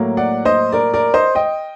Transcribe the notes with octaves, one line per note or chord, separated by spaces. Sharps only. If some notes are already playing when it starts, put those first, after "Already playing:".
Already playing: A2 F#3 A#3
D5 F#5
C5 D#5
A#4 D5
A#4 D5
C5 D#5
D#5 G5